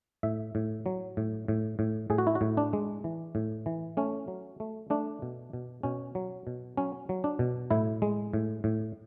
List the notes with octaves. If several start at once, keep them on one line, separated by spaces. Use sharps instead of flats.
A2 E5
A2
F#3
A2
A2
A2
A2 G#4
F#4
E4
F#4
A2
D4
G#3
E3
A2
E3
A3 C#4
F#3
A3
A3 D4
B2
B2
B2 C#4
F#3
B2
F#3 C#4
F#3
D4
B2
A2 E4
G#3
A2
A2